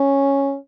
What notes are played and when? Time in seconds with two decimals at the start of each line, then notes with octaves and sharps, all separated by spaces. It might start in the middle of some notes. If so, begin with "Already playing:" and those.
Already playing: C#4